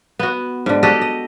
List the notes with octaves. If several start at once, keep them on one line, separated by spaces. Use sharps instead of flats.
B3 F#4
G#2 D3
F#4 G4 A4 D#5
D#5